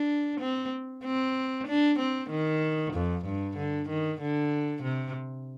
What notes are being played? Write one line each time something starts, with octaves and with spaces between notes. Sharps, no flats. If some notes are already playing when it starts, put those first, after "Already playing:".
Already playing: D4
C4
C4
D4
C4
D#3
F2
G2
D3
D#3
D3
C3